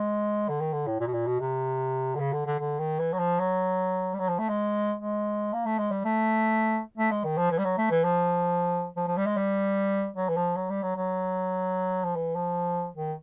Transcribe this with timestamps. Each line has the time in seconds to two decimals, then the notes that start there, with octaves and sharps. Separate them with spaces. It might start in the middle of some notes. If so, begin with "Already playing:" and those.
Already playing: G#3
0.49 D3
0.60 D#3
0.73 D3
0.87 A2
1.00 A#2
1.07 B2
1.13 A#2
1.27 B2
1.40 C3
2.15 D3
2.20 C#3
2.33 D3
2.46 D3
2.59 D3
2.79 D#3
2.99 E3
3.13 F#3
3.19 F3
3.39 F#3
4.14 G3
4.19 F#3
4.29 F3
4.39 A3
4.49 G#3
4.99 G#3
5.53 A#3
5.66 A3
5.78 G#3
5.91 G3
6.05 A3
6.97 A3
7.11 G#3
7.24 D#3
7.38 F3
7.51 E3
7.58 G3
7.64 F#3
7.77 A3
7.91 E3
8.04 F3
8.96 F3
9.07 F3
9.17 G3
9.26 G#3
9.37 G3
10.16 F#3
10.29 E3
10.37 F3
10.56 F#3
10.69 G3
10.82 F#3
10.96 F#3
12.04 F3
12.15 E3
12.35 F3
12.95 D#3